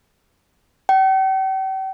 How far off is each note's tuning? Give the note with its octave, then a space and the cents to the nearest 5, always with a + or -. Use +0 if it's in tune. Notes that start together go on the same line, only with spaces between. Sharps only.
G5 -40